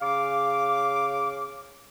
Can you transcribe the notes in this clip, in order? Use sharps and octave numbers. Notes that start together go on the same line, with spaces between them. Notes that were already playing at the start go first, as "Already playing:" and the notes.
C#3 F5 D6